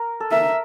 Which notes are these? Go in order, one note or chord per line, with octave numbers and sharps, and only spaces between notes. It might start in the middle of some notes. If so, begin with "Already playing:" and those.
Already playing: A#4
A4
A#4 E5